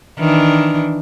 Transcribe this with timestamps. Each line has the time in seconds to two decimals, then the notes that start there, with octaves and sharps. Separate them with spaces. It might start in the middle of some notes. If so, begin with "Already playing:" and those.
0.19 D#3 E3 D4